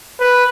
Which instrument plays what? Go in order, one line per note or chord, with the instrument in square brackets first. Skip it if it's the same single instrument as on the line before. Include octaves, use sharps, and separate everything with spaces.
[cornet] B4